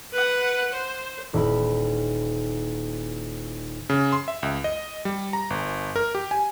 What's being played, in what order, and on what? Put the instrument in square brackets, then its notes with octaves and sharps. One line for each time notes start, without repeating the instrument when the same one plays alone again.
[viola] B4 F#5
C5
[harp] D#1 E4 B5
[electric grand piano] C#3
C6
E5
C#2
D#5
G3
A#5
G1
A#4
G4
G#5